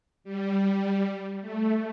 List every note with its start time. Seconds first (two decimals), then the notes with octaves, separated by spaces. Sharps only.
0.24 G3
1.41 A3